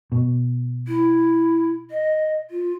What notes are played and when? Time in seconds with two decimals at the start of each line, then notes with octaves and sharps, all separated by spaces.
0.12 B2
0.88 E4
1.91 D#5
2.50 F4